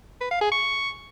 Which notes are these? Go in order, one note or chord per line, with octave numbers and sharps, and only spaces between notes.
B4
F5
G#4
C#6